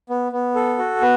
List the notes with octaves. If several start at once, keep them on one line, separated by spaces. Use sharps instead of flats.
B3
B3
A4
F#4
B3